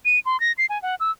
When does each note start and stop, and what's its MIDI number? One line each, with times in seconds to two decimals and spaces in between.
0.05 0.19 99
0.26 0.40 84
0.40 0.52 94
0.58 0.66 96
0.70 0.81 80
0.82 0.95 78
1.00 1.11 88